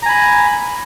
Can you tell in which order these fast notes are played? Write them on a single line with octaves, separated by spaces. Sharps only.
A#5 G#5 B5